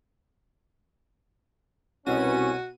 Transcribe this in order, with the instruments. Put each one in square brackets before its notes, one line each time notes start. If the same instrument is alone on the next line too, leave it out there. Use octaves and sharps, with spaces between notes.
[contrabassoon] C2 [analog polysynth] B2 D#7 [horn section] C#4 [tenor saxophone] F#4